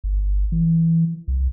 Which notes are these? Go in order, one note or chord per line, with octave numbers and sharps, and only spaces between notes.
G1
E3
C2